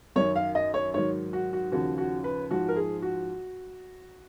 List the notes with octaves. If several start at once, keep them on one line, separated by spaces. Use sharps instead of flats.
F#2 D#3 F#3 C#5
F5
D#5
C#5
G#2 D#3 F#3 C#5
F#4
F#4
D#2 C#3 F3 F#4
F#4
B4
G#2 F3 F#4
A#4
G#4
F#4